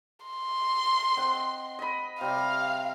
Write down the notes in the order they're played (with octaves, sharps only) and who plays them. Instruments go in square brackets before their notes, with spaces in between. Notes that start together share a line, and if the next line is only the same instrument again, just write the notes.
[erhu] C6
[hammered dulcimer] C4 D#5 F#5
D#5 B5
[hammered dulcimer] C3 G3 [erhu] F5